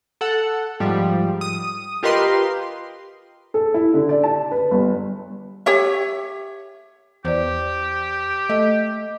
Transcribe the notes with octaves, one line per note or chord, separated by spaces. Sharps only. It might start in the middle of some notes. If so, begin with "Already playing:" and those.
A4 F#5
G#2 F3 G3
D#6
F4 G4 A#4 B4 D#5 C6
A4
E4
D3
D5
A5
B4
G1
G4 C#5 E5
E2 G4 C5 D5
A3 D#5